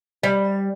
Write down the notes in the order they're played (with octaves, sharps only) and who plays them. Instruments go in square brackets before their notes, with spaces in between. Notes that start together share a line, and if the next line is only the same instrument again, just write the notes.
[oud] G3